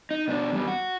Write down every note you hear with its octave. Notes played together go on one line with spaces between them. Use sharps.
D#4
B2 D4
E2 G3
F#4